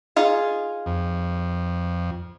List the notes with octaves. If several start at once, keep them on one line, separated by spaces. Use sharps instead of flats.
D#4 F4 G#4
F2